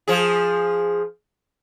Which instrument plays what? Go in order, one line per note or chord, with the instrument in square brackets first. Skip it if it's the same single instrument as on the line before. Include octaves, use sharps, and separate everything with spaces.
[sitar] F3 G#4